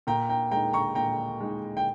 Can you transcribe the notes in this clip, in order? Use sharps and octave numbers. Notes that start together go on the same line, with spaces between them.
A#2 G5 A#5
G5 A#5
G#3 D#4 G5 A#5
A#5 C#6
A#2 G5 A#5
G#3 D#4
G5